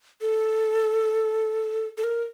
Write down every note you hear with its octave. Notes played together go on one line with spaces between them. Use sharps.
A4
A4
A#4